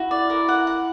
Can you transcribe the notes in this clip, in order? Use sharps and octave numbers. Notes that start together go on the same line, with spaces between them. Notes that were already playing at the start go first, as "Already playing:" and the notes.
Already playing: E4 F#4
D5
A#4
F#5
F#5